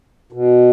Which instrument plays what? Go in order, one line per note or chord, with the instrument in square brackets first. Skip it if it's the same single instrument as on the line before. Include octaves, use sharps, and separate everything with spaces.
[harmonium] B2